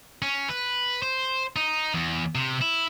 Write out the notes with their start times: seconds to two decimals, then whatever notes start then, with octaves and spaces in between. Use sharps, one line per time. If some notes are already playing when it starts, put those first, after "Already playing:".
0.22 C#4
0.49 B4
1.02 C5
1.56 D#4
1.94 E2
2.35 C3
2.61 E4